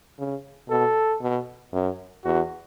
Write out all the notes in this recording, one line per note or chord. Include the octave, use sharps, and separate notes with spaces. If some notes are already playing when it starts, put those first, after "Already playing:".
C#3
B2 A4
B2
F#2
E2 F#4